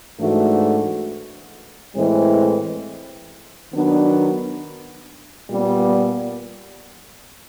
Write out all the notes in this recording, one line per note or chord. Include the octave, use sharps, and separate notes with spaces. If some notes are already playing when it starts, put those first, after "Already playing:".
G#2 E3 A3 D4 F#4
A2 E3 G#3 C4 E4
D#3 F#3 B3 D4
A#2 G3 B3